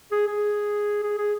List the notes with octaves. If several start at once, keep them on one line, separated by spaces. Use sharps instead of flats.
G#4
G#4
G#4
G#4